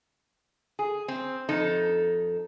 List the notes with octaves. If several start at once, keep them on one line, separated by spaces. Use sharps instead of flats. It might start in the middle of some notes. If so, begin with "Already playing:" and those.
G#4
C4
F2 D#4 A4